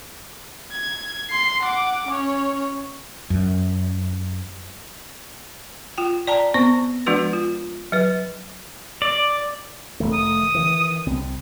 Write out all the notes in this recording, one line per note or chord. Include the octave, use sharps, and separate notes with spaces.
G#6
C6 C7
F#5 D6
C#4 C#5
F#2
F4 G5
D5 G5 A5 A#5
B3 C4 C5 C#6
F3 G#3 D4 F#4 B4
F4
F#3 B4
D5
F1 D#3 A3
D#6
D#3 E3
C2 C4